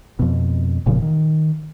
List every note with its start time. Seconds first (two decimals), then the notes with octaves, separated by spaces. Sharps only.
0.19 F2 B2
0.86 F1 A#2 C#3 F3
1.02 D#3